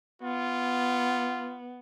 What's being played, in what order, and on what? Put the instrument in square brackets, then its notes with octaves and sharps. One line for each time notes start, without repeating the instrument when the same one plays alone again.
[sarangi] B3 [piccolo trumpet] F4